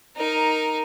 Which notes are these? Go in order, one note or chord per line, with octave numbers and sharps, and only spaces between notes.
D#4 A#4